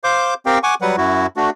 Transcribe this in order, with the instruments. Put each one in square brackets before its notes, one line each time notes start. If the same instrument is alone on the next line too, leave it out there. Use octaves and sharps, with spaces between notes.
[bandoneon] C5 F5 D6 G6
C4 G4 A#4 F5 G5
F#5 G#5 C#6 D6
F#3 G3 B4 F#5
F#2 E4 F#4
A3 D4 F#4